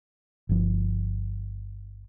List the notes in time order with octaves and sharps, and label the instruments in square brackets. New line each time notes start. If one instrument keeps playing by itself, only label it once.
[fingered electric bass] G1 F3